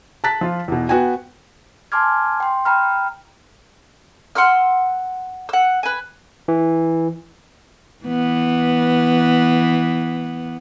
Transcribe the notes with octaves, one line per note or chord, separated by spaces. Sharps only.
A5 A#5 F#6 A6 B6
F3 F4
E2 B2
B3 F#4 G5 G#5
G#5 A5 C6 D6 F6 G#6
G5 C6
G5 A#5 B5 F6
F#5 C6 E6 F6
F#5 E6
B4 G#5
E3
E3 B3